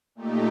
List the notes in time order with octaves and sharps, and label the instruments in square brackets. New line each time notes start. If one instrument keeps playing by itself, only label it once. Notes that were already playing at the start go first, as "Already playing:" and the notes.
[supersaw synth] A#2 A3 D#4 G4